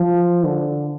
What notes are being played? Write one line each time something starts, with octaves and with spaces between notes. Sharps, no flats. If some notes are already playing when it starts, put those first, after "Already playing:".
Already playing: F3
D3